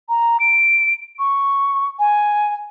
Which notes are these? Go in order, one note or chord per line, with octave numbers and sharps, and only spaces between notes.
A#5
D7
C#6
G#5